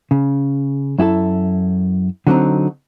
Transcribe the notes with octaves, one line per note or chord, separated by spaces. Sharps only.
C#3
F#2 E4 G4 A4
D3 F#3 C4 D#4